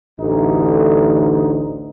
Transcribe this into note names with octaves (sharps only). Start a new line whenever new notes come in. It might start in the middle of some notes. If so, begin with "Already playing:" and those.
A1 D2 D3 D#4